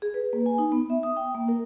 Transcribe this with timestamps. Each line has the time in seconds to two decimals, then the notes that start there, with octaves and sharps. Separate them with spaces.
0.02 G#4
0.14 B4
0.33 A#3
0.46 G#5
0.58 D#4
0.72 B3
0.90 E5
1.03 D#6
1.17 G5
1.35 A#3
1.48 A#4